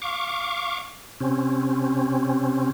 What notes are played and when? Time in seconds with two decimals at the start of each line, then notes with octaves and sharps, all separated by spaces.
0.02 F5 C#6 D6
1.20 C3 C4 C#4